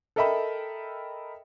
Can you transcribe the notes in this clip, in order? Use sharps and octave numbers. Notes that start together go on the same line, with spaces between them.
A4 A#4 D#5 E5 G5 B5